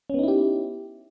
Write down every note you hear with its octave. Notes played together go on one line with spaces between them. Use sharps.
B3 C#4 D#4 E4 G4